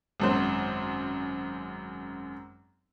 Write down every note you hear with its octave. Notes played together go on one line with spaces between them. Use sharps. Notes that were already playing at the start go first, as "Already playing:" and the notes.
G#1 F#2 C5